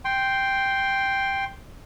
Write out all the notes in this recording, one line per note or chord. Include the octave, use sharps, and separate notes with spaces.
G5 C6